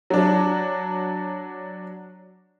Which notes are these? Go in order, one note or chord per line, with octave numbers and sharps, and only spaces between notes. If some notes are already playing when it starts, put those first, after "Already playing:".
F#3 D4